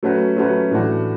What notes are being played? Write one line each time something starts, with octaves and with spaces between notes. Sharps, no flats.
F#3 A3 C#4 F#4 B4
F#3 A3 C#4 F#4 B4
A2 E3 A3 D4 F#4